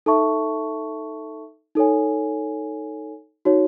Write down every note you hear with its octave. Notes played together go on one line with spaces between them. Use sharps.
D#4 A4 E5 A5 C#6
D#4 A4 C#5 G#5
D#4 F#4 C#5